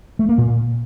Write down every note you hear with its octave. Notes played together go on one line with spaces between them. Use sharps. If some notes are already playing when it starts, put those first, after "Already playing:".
A3
A#3
A#2